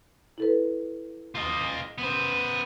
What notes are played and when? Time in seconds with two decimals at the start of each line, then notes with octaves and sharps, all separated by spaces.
0.38 E4 A4 B4
1.35 F4 D#5
1.98 B3 C5